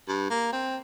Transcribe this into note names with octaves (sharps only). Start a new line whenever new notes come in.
G2
A#3
C4